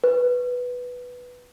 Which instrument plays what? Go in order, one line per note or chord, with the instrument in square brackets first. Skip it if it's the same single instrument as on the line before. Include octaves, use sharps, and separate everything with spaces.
[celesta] B4